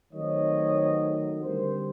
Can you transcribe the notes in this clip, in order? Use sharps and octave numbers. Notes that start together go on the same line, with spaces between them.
D#3 F#3 A3 C4 C#5 D#5
D3 G3 C4 A#4 C5